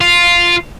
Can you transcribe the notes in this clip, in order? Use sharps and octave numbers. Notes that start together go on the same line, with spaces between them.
F4